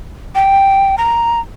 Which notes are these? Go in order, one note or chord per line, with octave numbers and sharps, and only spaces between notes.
G5
A#5